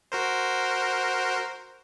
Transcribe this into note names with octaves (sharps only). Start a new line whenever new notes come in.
F#4 A#4 C5